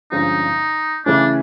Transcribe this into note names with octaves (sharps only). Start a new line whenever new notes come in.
G2 D3 F3 G#3 C#4 D#4
C#3 E3 A3 C#4 D4